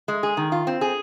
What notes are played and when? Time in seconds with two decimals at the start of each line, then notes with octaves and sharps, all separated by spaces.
0.08 G#3
0.23 G#4
0.37 D#3
0.52 F4
0.67 C4
0.81 G#4